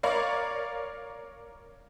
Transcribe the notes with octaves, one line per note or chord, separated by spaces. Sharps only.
A#4 C#5 D5 F5